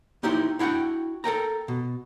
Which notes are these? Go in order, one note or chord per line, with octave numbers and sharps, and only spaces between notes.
A#3 D#4 E4 G4 C5
D4 E4 F#4 F#5 G5
A4 A#4 G5 A#5
B2